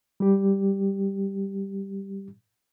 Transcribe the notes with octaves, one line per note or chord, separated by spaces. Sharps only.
G3 G4